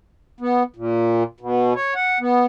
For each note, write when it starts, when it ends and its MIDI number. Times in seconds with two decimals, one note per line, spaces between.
0.40 0.63 59
0.76 1.23 46
1.40 1.73 47
1.76 1.94 73
1.95 2.18 78
2.20 2.46 59